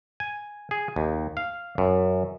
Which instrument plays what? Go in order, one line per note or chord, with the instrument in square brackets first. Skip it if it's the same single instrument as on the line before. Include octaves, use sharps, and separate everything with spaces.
[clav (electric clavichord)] G#5
G#4
D#2
F5
F#2